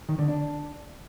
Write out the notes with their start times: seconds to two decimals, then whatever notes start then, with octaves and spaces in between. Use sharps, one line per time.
0.09 D#3
0.18 D3
0.28 D4